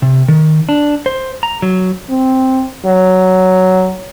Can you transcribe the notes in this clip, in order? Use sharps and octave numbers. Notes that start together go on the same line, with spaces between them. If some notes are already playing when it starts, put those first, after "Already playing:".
C3
D#3
D4
C5
A#5
F#3
C4
F#3